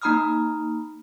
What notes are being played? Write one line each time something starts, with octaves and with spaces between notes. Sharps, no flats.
A#3 D#4 A#5 B5 D#6 F6